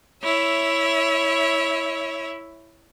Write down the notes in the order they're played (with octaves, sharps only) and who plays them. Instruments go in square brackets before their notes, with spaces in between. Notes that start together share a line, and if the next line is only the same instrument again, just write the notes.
[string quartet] E4 C#5 E5